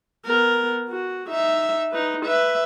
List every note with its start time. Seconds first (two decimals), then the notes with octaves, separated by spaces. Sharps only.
0.24 B3 A#4
0.89 F#4
1.29 D#4 E5
1.92 D#4 B4
2.24 B4 E5